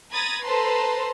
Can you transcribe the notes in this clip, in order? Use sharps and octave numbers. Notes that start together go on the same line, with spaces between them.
A#5 B5 D#6 G#6 A6
A4 B4 C5 A5 A#5 C6